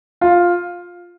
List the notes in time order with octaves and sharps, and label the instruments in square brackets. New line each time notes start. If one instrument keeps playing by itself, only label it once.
[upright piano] F4